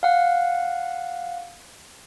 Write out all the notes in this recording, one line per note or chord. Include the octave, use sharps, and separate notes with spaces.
F5 F#5